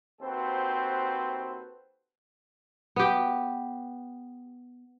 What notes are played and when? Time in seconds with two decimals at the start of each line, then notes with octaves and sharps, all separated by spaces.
0.21 D#2 C4 F#4 A4 B4 C5
2.96 B3 G4